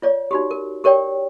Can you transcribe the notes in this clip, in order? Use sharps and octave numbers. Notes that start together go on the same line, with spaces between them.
F4 C#5 D5
D#4 F#4 G4
A#4
G4 A#4 C#5 D5 G5